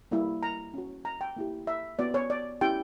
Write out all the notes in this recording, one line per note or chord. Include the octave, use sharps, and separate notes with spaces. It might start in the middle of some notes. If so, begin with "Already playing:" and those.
G3 A#3 E4
A#5
C#4 F#4
A#5
G5
A#3 E4 G4
E5
B3 F#4 D5
C#5
D5
C#4 E4 G4 G5